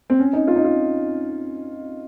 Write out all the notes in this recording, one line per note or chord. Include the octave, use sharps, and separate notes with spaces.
C4
C#4
D#4
F4
D#4
F4